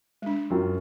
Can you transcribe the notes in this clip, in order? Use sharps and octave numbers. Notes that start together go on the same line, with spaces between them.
G#3 D4
F#2 F4 G5